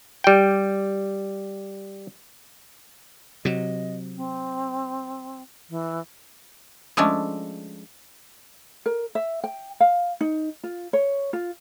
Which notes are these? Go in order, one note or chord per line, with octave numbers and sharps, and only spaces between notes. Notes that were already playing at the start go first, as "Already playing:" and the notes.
G3 G5
C3 F#3 D#5
C4
E3
F3 G#3 A3 C#4 D4
A#4
E5
G5
F5
D#4
F4
C#5
F4